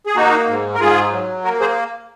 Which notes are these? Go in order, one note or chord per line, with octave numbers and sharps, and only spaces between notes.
G#4
A#3 D#4 F#4
G#2
A#4
G#2 F4 G#4
F#3
A#3 F#4 A#4
G#4 C5